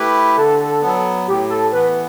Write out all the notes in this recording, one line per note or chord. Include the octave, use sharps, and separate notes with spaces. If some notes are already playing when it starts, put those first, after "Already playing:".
Already playing: A3 E4 G4 B4
D3 A4
F#3 B3
A2 G4
A4
E3 B3 B4